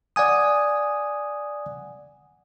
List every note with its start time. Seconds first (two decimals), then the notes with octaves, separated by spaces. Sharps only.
0.16 D5 F#5 G#5 D#6